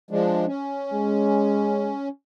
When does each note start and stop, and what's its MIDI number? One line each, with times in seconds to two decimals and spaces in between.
0.11 0.45 53
0.11 0.45 56
0.11 0.45 62
0.47 2.09 61
0.92 1.93 56